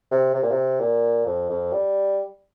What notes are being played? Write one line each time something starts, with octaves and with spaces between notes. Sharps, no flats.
C3
C3
A#2
C3
A#2
F2
F2
G3